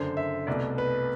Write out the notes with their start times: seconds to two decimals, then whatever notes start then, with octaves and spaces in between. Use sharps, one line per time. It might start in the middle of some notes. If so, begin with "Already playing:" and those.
Already playing: F#1 F#2 D3 C5
0.17 E5
0.47 C2 B2 A3 D5
0.78 B4